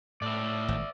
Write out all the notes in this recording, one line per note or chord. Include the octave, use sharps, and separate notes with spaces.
A2 D5 E5
G#1